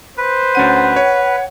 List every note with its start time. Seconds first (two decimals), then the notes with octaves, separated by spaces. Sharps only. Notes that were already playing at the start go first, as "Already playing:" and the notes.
0.17 B4 C5
0.55 D2 C#4 F#5 D#7
0.96 C#5